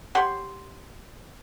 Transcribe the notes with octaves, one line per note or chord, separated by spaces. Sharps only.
G4 C#5 F#5 C6